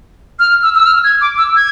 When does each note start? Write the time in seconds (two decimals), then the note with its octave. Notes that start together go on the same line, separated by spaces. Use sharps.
0.39 F6
0.63 E6
0.75 E6
0.86 F6
1.04 G#6
1.21 D6
1.38 E6
1.56 G#6